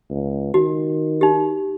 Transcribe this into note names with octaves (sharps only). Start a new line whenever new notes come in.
C#2
D#3 F#4
D#4 G4